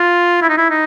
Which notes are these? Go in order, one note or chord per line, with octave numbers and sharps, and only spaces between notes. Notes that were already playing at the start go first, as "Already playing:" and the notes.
Already playing: F4
E4
D#4
E4
D#4